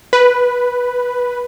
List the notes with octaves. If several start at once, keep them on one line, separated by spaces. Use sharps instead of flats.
B4